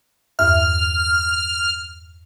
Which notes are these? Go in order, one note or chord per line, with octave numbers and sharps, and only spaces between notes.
E2 G2 E5 F6